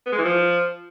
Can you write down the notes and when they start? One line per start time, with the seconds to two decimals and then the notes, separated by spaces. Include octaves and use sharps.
0.06 B3
0.12 G#3
0.18 E3
0.24 F3